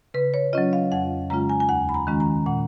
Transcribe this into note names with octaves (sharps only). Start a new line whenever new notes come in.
C#3 B4
C#5
F#3 C#4 F4 D#5
F5
F2 F#5
C#3 G#3 C#4 F4 A#5
G#5
G#5
D#2 F#5
B5
A#5
D#3 G#3 C#4 F4
A#5
A#2 F#5